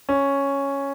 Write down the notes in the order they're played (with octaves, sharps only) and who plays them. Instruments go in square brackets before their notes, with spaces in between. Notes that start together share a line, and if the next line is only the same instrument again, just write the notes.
[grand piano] C#4